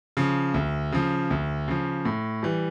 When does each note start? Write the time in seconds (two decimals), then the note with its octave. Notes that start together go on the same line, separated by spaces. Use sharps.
0.17 C#3 F3
0.54 D2
0.92 C#3 F3
1.30 D2
1.68 C#3 F3
2.05 A2
2.43 E3 G3